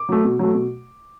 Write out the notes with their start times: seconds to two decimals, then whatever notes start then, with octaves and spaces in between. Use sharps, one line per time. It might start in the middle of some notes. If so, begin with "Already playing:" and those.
Already playing: D6
0.09 F#3 A3
0.24 B2
0.39 F#3 A3
0.54 B2